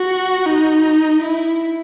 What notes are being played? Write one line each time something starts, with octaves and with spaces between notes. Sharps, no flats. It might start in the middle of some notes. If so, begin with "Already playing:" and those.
Already playing: F#4
D#4
E4